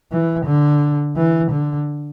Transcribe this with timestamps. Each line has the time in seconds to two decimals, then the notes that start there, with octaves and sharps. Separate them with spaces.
0.12 E3
0.46 D3
1.16 E3
1.51 D3